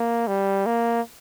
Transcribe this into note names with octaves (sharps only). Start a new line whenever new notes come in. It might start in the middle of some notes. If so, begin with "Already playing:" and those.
Already playing: A#3
G3
A#3